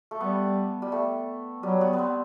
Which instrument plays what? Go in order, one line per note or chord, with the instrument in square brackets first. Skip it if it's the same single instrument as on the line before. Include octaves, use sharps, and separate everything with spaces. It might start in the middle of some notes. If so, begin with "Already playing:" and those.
[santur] A3
[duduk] G3 [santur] B3
[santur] G3
A3
[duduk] F#3 [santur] G3
[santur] B3
B3
C4